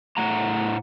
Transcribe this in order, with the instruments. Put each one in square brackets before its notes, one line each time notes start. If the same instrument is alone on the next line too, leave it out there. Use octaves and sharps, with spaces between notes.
[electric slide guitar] A2 A3 F#5 A#5